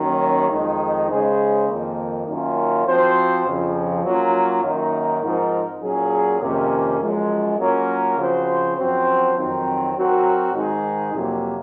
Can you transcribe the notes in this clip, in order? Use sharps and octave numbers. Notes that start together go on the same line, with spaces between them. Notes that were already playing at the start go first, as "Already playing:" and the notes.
Already playing: F#2 D#3 F#3 A#3 C#4
F2 D#3 G#3 D#4
C#3 G#3 D#4 G#4 C5
F2 D#3 A#3
F#2 D#3 A#3 C#4 F4
F3 C4 F#4 C5
F2 C#3 F3
F#3 A#3 C#4 F4
F#2 D#3 A#3 D#4 A#4
G#2 F3 C4 D#4 A#4
A#2 F#3 C#4 G#4
F2 C3 D#3 A#3 C#4
F#2 F3 G#3
F#3 A#3 C#4 F4 A#4
C#3 F3 C4 F#4 C5
F#2 F3 C4 F#4 C5
F2 D#3 F#3 C4
F#3 C4 F#4 A#4
G#2 D#3 G#3 D#4 G#4
F2 C3 F#3 A#3